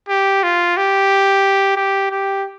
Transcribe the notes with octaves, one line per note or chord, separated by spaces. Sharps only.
G4
F4
G4
G4
G4